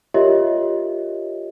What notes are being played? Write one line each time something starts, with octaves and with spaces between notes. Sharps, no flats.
F4 G4 A#4 C#5 D#5 E5